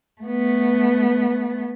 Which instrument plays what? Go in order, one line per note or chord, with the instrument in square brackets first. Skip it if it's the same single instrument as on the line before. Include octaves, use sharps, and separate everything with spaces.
[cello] A3 B3